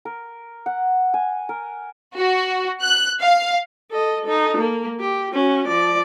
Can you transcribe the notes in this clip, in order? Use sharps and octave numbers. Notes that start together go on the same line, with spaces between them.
A#4
F#5
G#5
A#4
F#4
F#6
F5
A4 D#5
D#4 A4
A#3
G4
C#4 F#4
F3 D5